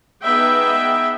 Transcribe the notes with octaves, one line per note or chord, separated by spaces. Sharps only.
B3 D#4 G#4 B4 E5 G5